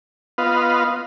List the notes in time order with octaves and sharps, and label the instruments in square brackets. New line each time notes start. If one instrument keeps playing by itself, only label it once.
[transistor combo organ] B3 F4 B4 D#5 F5